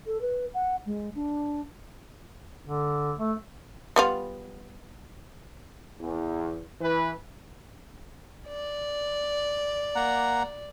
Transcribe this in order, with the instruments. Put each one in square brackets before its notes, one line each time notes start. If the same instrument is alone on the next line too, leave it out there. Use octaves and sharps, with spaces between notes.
[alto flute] A4
B4
F#5
G#3
D4
[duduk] D3
A3
[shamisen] G3 B3 F4
[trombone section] E2
E3 B4
[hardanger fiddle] D5
[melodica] A#3 F#5 A#5